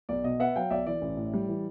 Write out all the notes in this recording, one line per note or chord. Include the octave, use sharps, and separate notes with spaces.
B1 D5
B2 D#5
B3 E5 F#5
F#3 F5 G5
B1 D5 E5
E3 D5
A1
A2
G3
E3